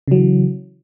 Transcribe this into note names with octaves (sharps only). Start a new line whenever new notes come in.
C#3 E3 F#3